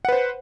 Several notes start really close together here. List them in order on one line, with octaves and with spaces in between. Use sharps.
F#5 B4 C5